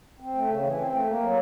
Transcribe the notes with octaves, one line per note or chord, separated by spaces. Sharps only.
C4
A3
C#3
E3
C4
A3
A#3
F#3